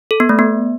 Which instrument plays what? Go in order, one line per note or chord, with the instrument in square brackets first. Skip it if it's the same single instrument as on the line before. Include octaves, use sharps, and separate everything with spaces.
[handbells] A4
B3
A3
B3